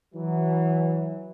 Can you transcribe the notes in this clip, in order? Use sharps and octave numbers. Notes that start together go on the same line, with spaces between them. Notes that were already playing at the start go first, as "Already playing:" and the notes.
E3 F#3